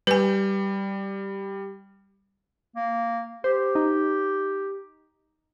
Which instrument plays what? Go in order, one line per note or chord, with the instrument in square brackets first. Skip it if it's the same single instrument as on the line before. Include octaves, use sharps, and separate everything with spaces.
[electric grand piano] G3 [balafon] B4 G#5
[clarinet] A#3
[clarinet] G4 [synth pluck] C5
[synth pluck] D#4